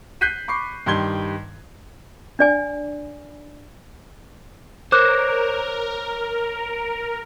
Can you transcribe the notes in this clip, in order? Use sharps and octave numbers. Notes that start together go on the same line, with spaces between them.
F#6 G6 B6 C7 D#7
B5 C#6 D6 C7
G2 D#3 G3 C6 G#6 G7
D4 D5 G#5
A#4 C5 C#5 D6 F#6